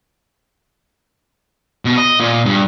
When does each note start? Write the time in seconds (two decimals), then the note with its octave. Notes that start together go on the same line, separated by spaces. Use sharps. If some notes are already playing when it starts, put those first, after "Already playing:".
1.85 B2
1.97 D#5
2.20 A#2
2.46 G2